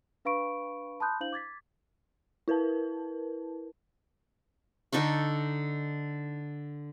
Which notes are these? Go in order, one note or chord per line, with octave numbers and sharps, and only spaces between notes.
D4 B4 F5 B5 C#6 D7
A5 B5 C6 D#6 F#6 G6
D4 E4 C5 F5 G6 F#7
D6 G#6 A6 B6
E4 A#4 B4 A5
D3 D#4 A4 C#6